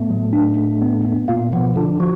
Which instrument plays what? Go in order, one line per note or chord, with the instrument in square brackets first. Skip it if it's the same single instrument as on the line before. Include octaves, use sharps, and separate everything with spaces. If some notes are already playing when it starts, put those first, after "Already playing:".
Already playing: [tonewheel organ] A2 A3 [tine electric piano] B3
[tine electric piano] F#3
D4
D4
B3
B3
[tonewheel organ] A#2 A#3 [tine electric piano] F4
[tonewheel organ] B2 B3 [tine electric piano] F3
[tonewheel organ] D3 D4 [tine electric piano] F4
[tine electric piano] F3 [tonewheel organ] F#4